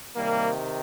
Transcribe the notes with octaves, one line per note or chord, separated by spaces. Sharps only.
C3 D#3 G3 A#3